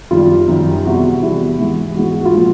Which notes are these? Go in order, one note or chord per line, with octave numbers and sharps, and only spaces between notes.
F#2 D#3 G3 F4
F#2 D#3 G3
E2 C3 E3 G3 F#4
F#4
E2 C3 E3 G3
G#2 E3 G#3
G#2 E3 G#3 F#4
F#4
F4
A#2 F3 G#3